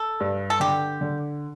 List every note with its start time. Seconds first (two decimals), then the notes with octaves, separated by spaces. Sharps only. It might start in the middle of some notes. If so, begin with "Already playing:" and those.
Already playing: A4
0.20 G2
0.50 A4
0.60 D3 G4
1.01 D3